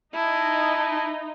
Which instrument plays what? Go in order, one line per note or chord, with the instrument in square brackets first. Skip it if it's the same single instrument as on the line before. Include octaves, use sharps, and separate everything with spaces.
[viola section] D#4 [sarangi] E4 [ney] A5